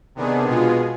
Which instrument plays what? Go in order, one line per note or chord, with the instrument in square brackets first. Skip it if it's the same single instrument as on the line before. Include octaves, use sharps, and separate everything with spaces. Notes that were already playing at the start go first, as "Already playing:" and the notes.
[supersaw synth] C3 D#3 B3 D4 G#4
B2 G#3 B3 F4 G#4